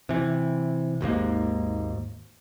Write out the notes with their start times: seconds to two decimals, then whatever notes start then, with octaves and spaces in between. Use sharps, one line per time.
0.09 C3 E3
1.01 G#1 D#2 G#2 A#3